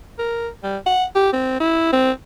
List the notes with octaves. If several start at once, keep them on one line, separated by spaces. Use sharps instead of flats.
A#4
G3
F#5
G4
C4
E4
C4